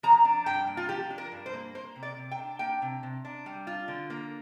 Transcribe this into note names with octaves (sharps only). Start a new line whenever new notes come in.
F3 A#5
D4
G2 G5
A#3
F4
F3 G4
D4
A#4
G2
C5
A#3
A#3 C5
C3
D5
C3
G5
D4
A#3 G5
C3
C3
D4
G3
F4
D3
A#3